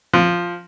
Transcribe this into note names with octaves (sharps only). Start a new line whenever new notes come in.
F3